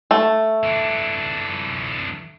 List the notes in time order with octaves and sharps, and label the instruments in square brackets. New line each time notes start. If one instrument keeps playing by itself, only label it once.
[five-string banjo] A3
[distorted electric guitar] E3 D4